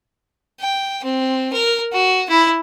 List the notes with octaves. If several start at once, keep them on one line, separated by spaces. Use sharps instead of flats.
G5
C4
A#4
F#4
E4